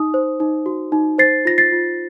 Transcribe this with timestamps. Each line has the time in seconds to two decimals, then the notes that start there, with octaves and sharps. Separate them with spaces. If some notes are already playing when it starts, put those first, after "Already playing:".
Already playing: D#4 D#6
0.14 C5
0.40 D#4
0.66 F#4
0.92 D#4
1.18 C5 A6 C7
1.45 F4 A#6
1.58 A6 C7
1.72 F4